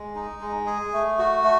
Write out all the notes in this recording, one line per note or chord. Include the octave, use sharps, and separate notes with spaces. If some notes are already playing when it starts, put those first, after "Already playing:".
Already playing: G#3
D#4
G#3
G#4
A3
F#4
A3